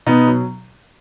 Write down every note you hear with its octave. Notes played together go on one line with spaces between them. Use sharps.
B2 B3 D#4
F#3